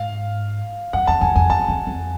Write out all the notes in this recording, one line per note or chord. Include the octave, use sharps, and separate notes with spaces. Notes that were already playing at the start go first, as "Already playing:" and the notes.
Already playing: G#2 F5
F#2 F#5
F2 A5
F2 G#5
F2 G#5
E2 A5
F2
F2